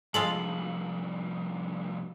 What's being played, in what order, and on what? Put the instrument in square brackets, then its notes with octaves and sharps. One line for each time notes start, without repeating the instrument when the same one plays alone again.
[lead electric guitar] C2 F3 [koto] G#3 F4 A4 [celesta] F#7